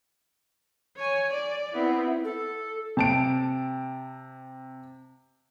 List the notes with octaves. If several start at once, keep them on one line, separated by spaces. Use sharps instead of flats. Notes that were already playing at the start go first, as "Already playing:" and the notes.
C#5 G#5
D5
B3 C4 E4
A4
C3 A5 D7